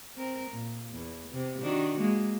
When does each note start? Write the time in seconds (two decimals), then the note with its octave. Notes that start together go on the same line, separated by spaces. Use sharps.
0.17 C4 A#4
0.51 A#2
0.91 E2
1.33 C3
1.62 D#3 D4 F#4
2.00 G#3 A#3